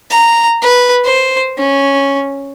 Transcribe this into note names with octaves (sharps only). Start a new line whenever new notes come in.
A#5
B4
C5
C#4